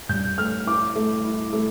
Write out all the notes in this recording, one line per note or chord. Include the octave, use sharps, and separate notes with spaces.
G2 G6
A3 F6
E4 D6
A3
E4
A3